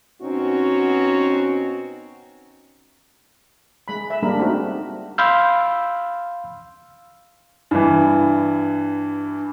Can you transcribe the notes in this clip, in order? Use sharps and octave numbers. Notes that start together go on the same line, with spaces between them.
B2 C4 C#4 D#4 F#4
G#3 B5
E5
G3 G#3 A#3 D4 A#4 B5
G#3 A3 C4 D#4 F#4
F5 B5 C6 E6 F6 G6
G2 E3